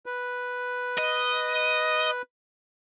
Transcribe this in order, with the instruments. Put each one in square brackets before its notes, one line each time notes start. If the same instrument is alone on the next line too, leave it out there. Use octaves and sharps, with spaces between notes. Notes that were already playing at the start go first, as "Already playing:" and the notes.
[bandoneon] B4
[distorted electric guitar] D#5